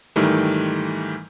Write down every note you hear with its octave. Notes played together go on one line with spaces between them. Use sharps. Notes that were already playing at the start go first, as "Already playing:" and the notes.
G#2 D#3 E3 G3 A3